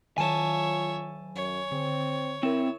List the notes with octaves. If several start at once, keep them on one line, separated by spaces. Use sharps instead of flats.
D#3 F#3 F4 C#5 E5 G#5 A5
F#2 C#5
D3 C4
C4 E4 A#4 E7